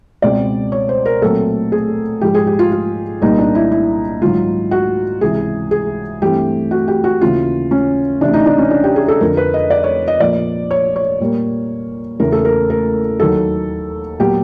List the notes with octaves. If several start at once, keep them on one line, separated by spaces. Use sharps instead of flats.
C#2 B2 G#3 C4 D5
C#5
C5
A#4
A#2 F#3 A3 C4 A4
G#4
G#2 F3 G#3 G4
G#4
G4
F4
F4
C2 A#2 G3 A#3 D#4
D4
E4
E4
G#2 D#3 F#3 F4
F#4
C#2 C3 E3 G#4
G#4
G2 E3 A3 C4 G4
F#4
G4
F#4
D#2 C#3 E3 F4
C#4
D2 C3 E3 D4
D#4
D4
C#4
D4
G4
G#4
A4
F2 D3 F3 A#4
B4
D#5
D5
C#5
D#5
A#2 F3 A#3 D5
C#5
C#5
A#2 G3 A#3
E2 C#3 E3 A3 A#4
A4
A#4
A#4
D#2 D#3 F#3 A#3 A4
A#2 F#3 B3 G4